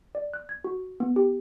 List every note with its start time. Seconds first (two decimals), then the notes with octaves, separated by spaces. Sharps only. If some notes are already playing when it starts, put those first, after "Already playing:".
0.15 D5
0.33 F#6
0.49 G#6
0.64 F#4
1.00 B3
1.16 G4